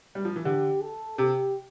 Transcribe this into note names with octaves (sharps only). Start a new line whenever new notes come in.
G3
F3
E3
D3 G4
A4
C3 G4